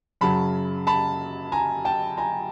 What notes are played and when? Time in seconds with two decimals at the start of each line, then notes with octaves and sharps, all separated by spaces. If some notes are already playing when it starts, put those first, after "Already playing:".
0.21 F#2 C#3 F#3 A5 B5
0.87 A5 B5
1.52 G#5 A#5
1.85 G5 A5
2.17 G#5 A#5